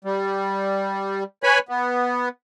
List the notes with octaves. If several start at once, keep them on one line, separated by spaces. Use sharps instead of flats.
G3
B4 C#5 G#5 B5
B3